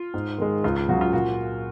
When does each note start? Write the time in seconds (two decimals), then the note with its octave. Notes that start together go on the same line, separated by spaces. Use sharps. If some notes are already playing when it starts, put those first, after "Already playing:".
Already playing: F4
0.14 G#2
0.38 D#3 G#3
0.64 C#2 F4
0.76 F4
0.89 C#3 F#3 F#4
1.01 F4
1.13 A#2 F#4